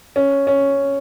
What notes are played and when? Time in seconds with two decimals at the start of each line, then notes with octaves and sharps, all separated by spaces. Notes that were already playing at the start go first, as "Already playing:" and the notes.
0.16 C#4
0.47 C#4